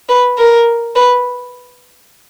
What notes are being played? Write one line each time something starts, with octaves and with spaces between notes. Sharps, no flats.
B4
A#4
B4